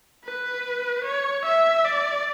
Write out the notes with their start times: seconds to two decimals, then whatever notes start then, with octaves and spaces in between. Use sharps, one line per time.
0.24 B4
1.04 C#5
1.45 E5
1.85 D5